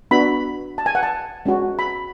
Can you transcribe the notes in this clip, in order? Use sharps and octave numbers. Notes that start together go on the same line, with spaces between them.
B3 D4 F#4 B5
A5
G#5
F#5
A5
G#3 C#4 F#4
B5